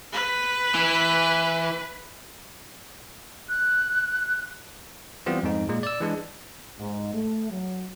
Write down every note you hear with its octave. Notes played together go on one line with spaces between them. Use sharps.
B4
E3
F#6
E3 G3 B3 C4 F4
F2 G#2 D#4
A#2 G#3
D5 E6
E3 G#3 D4
G#2
A3
F#3